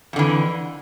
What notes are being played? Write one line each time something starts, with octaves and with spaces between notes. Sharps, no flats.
F2 D3 E3